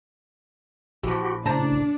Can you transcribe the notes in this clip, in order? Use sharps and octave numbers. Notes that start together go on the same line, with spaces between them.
A#1 E3 F3 F#4 G4
A2 C#3 D4 C5 A5 A#5